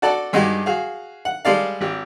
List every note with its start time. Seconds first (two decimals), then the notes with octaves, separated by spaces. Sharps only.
0.02 F#4 A4 D5 F#5 A5
0.33 G2 G#3 D#4 F#4 G4
0.66 F#4 G#4 F5
1.25 F#5
1.45 G3 G#3 A4 D5 F5
1.81 G#1 G4